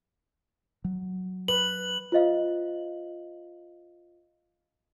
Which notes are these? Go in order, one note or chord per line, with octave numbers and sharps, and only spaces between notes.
F#3
B4 F#7
F4 C5 D#5 F5